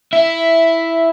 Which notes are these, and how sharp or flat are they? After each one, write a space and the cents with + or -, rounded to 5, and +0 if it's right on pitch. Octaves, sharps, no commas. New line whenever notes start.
E4 +0 E5 +5